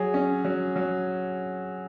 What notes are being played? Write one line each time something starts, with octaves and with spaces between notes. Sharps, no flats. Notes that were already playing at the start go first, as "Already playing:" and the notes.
Already playing: F#3 G#4
C#4
F#3
F#3